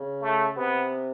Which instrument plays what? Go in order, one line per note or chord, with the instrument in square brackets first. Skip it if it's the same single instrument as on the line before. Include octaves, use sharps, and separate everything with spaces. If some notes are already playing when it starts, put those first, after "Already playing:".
Already playing: [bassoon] C#3
[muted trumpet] A3
[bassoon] C3 [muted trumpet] B3